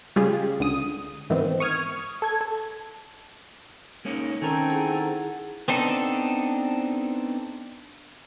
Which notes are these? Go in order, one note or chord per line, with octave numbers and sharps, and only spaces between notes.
C#3 G3 G#3 F4 G4 G#4
C#2 D3 D#6
G#2 D#3 E3 B3 C4
C#6 D#6 F6 G#6
A4 G#6
A4
G#3 A#3 C#4 D#4
D#3 C4 C#4 A4 A#4 G#5
E4 G#4 F#5
B3 C4 D4 D#4 A4